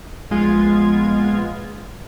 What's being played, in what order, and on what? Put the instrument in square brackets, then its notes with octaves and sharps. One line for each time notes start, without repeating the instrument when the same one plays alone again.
[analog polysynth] A#1 G#3 B3 F4 G#6